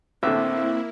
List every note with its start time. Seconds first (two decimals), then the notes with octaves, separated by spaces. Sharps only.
0.23 A1 D3 A#3 C4 E4 E5